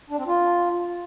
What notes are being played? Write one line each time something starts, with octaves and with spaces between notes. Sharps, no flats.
D4
C4
F4